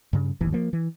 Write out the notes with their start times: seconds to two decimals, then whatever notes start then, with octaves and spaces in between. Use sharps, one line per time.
0.13 G2 C#3
0.41 D1 G1 D#2 E3
0.52 F3 A#3
0.73 E3